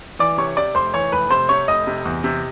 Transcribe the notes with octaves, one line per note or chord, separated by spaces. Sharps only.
E3 D5 D6
C3 C#5 C#6
C3 D5 D6
F1 C5 C6
E3 C#5 C#6
F1 B4 B5
C3 C5 C6
C3 C#5 C#6
F1 D#5 D#6
C3
E2
C3